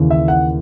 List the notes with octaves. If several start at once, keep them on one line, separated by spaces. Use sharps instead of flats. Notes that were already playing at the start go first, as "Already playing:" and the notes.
Already playing: D#2 C#3 E3
E5
F#5